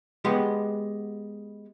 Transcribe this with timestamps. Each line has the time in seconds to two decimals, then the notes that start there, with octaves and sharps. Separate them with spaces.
0.25 G#3 B3 G4 F#5